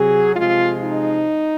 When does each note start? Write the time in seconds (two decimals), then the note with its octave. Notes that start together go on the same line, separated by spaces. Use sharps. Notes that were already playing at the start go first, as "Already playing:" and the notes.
Already playing: C3 F#3 G#4
0.35 C3 F3 G#3 F4
0.82 D#4